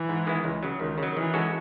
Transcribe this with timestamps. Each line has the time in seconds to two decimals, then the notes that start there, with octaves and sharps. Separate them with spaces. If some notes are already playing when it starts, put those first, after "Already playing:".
Already playing: E3
0.09 G#2
0.27 D#3 G#3 B3 E4
0.44 C#2
0.63 C#3 F#3
0.80 C#2 D#3
0.98 C#3
1.03 F#3
1.17 D#3 E3
1.34 G#3 C#4 F#4 A4